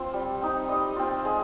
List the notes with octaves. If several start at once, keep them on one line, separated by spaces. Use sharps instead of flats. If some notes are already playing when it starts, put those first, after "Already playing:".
Already playing: C4 F4
G3
C4 D#4
G3 D#5
C4 F4
G#3